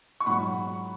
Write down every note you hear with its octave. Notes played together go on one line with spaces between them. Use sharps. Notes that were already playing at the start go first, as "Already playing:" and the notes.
C#6
G#2 F#3 F#5 B5